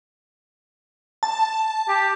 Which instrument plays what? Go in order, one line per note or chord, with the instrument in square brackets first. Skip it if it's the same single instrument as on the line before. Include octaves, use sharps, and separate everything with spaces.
[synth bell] A5
[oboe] G4